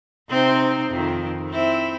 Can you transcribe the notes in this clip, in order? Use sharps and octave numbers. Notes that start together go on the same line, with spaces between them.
C3 C4 D#4
F2 D#3
C4 E4